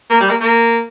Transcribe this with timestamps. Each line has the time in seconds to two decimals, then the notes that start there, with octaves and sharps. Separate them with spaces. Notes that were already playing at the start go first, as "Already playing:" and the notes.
0.10 A#3
0.20 G3
0.30 A#3
0.40 A#3